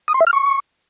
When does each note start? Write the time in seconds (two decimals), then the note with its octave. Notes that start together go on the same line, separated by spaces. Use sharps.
0.08 D#6
0.14 C6
0.20 E5
0.27 F6
0.33 C#6